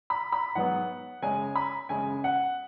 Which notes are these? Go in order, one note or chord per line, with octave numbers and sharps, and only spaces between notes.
B5
B5
G#2 F#3 B3 F#5
F#2 C#3 G#3 C#4 G#5
B5
F#2 C#3 G#3 C#4 G#5
F#5